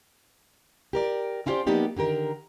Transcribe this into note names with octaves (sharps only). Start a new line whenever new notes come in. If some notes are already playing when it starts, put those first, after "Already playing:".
G4 A#4 D5
C#4 E4 F4 G4 C5 D5
F3 A#3 B3 D#4 G4 D5
D3 D#3 G4 A#4